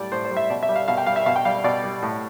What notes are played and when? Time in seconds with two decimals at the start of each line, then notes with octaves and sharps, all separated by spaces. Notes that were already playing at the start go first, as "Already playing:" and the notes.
Already playing: A2 G3 D5
0.12 A2 C5
0.25 C5
0.31 G3
0.37 E5
0.50 B2 D5
0.63 E5
0.69 G3
0.76 F5
0.88 B2 F5
0.98 G5
1.06 G3 F5
1.16 E5
1.26 B2 F5
1.36 G5
1.45 G3 F5
1.64 B2 D5
1.84 G3
2.02 A2